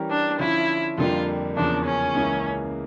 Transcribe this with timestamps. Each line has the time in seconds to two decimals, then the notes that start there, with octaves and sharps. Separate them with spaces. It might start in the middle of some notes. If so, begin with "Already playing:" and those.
Already playing: E3 G3 C#4 G4 A#4
0.10 D4
0.39 D3 F3 C#4 E4 F4
0.98 F2 D3 G3 A#3 F4
1.56 E2 C#3 F3 A#3 C#4 D4
1.86 C#4
2.14 C#2 C#3 E3 A#3 E4